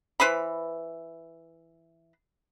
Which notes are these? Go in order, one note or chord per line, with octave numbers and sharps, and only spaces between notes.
E3 B4 C5 B5